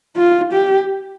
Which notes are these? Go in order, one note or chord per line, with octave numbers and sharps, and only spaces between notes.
F4
G4